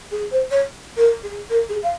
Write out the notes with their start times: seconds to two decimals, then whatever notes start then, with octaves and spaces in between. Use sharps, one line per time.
0.11 G#4
0.31 C5
0.51 C#5
0.97 A#4
1.23 G#4
1.50 A#4
1.69 G#4
1.83 F5